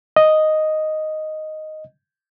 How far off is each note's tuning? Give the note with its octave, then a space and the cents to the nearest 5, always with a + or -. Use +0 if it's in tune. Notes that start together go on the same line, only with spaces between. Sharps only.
D#5 +0